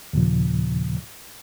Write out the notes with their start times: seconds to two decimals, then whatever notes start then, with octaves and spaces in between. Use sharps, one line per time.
0.13 D#2 A#2 C#3 F3